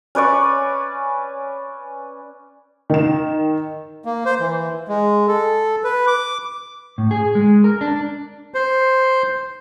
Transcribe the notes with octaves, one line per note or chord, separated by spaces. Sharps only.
C#4 B4 D5 C#6
D#3 E7
A#3
C5
E3
G#3
A4
B4
D6
A2
G#4
G#3
A#4
D4
C5